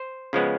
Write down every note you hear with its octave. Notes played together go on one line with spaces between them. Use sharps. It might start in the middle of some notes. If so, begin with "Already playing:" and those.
Already playing: C5
C#3 F3 G#3 B3